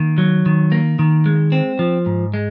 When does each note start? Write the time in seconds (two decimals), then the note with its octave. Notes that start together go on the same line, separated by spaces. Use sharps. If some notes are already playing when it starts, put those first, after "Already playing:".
Already playing: D#3 A#3
0.18 F#3
0.46 D#3
0.72 A#3
0.99 D#3
1.26 G#3
1.52 C4
1.79 F3
2.06 G#2
2.34 G#3